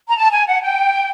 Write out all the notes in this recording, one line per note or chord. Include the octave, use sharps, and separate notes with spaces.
A#5
A5
G#5
F#5
G5